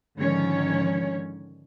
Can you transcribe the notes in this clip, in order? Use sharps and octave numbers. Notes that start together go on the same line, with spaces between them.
G#2 D3 D#3 F3 C#4 C#5